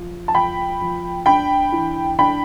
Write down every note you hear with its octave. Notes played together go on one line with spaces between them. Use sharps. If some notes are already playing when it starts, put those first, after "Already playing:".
Already playing: F3
A5
F3 G5 B5
F3
D4 G5 B5
E3
D4 G5 B5